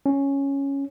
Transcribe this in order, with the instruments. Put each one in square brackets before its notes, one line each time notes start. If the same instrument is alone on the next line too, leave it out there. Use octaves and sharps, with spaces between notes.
[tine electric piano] C#4